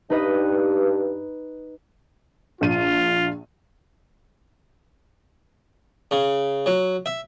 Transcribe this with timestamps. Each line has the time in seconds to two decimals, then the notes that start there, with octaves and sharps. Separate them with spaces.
0.10 G2 D#4 B4 D#5
2.61 A#1 F4 D#7
6.11 C#3
6.66 F#3
7.06 E5